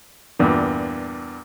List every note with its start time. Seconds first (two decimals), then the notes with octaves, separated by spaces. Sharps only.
0.39 E2 G2 A#2